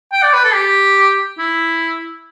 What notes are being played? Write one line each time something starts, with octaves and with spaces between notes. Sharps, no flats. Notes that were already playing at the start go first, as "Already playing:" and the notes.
G5
D5
B4
A4
G4
E4